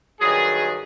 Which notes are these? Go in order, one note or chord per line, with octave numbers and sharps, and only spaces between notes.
G2 D#3 F#3 G#4